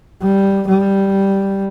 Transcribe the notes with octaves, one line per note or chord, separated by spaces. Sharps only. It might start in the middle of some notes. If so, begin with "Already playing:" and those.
G3
G3